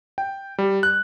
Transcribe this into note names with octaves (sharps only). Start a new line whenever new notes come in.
G5
G3
F#6